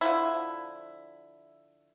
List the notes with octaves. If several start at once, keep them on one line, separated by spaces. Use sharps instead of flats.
D3 F3 E4